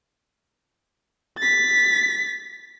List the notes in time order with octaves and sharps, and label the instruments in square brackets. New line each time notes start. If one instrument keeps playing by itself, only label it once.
[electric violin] A6 B6